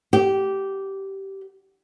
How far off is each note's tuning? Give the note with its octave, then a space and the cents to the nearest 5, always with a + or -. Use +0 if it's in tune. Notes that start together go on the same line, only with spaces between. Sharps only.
G4 -15